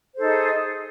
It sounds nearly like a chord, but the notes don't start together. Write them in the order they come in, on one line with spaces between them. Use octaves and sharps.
C5 A4 D#4 G#4